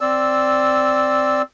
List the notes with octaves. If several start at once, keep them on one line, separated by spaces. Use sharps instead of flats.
C4 D5 E6